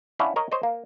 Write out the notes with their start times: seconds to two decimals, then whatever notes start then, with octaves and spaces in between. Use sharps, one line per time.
0.19 C#4 D4 E4 F5 F#5
0.36 A#4 C#5 D#5
0.52 C5 C#5 D#5
0.63 A#3